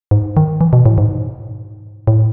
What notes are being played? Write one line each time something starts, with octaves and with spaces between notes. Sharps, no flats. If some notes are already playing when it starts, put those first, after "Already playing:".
G#2
D#3
E3
B2
A2
G#2
A2